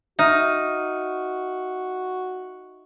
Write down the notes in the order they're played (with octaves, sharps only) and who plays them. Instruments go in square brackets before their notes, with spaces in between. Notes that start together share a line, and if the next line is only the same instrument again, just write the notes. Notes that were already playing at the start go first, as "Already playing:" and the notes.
[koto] D#4 [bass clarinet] F#4 [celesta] E5 F6 D#7